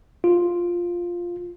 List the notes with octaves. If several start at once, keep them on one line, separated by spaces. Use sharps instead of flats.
F4